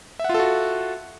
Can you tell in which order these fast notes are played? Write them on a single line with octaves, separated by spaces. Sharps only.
E5 F#5 F4 A4 F#4